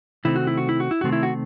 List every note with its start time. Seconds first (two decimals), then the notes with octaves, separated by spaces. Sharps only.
0.25 C3 D#3 A3 C4 E4
0.36 F#4
0.47 E4
0.57 F#4
0.69 E4
0.80 F#4
0.91 E4
1.01 C3 D#3 A3 C4 F#4
1.12 E4
1.23 F#4